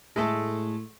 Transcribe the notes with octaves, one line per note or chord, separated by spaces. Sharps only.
A2 G#3 A3 A4